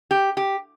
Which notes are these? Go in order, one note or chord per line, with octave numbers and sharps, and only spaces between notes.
G4
G4